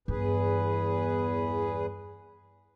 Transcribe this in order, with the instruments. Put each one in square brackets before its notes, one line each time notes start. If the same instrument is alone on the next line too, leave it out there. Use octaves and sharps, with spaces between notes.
[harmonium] E2 G#4 B4 [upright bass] G2